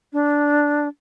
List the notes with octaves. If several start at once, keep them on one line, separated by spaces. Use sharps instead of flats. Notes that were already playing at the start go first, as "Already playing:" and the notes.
D4